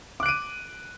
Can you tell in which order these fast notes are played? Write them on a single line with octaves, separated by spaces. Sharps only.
D6 F#6 D7 D#7